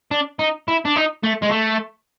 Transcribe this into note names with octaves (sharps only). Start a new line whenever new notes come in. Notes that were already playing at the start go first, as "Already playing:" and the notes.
D4
D#4
E4
D4
D#4
A3
G#3
A3